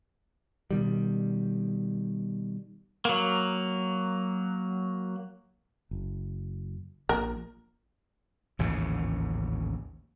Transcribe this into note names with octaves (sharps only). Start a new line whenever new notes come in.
B2 D#3 G3
F#3 A#3
F#1
A#1 A#2 A#4
A1 D#2 G#2 C#3